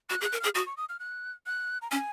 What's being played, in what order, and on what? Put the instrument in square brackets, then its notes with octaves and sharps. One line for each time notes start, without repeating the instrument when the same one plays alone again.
[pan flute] F#4 [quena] F#6
[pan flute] G#4
[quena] F#6
[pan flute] A#4
[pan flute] G#4 [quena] F6
[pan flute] F#4 [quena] D#6
[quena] C#6
D#6
F6
F#6
F#6
A#5
[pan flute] C#4 [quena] G#5